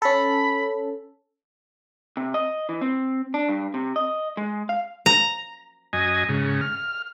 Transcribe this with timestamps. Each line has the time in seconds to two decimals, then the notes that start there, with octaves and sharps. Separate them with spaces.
0.02 C#4 A4 B5
2.17 C3
2.34 D#5
2.69 E3
2.81 C4
3.34 D4
3.49 G2
3.74 C3
3.96 D#5
4.37 G#3
4.69 F5
5.06 A#5
5.93 F#2 D#5 G#5
6.29 G#2 C#3
6.61 F6